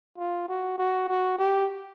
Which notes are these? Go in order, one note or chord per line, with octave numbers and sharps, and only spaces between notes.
F4
F#4
F#4
F#4
G4